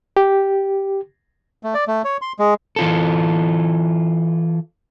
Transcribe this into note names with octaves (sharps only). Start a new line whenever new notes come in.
G4
A3
D5
A3
C#5
C6
G#3
E3 F4 A4